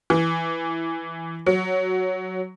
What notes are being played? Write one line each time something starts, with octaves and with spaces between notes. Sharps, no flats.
E3
F#3